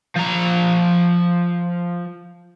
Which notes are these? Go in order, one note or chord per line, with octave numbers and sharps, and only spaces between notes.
F3 A#5